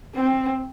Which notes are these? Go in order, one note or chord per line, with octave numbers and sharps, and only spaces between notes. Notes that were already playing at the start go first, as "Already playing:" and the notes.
C4